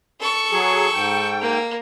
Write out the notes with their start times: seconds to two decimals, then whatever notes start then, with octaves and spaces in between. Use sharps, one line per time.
0.20 A4 C#6
0.52 F#3 G#4
0.94 G#2 G5
1.41 A#3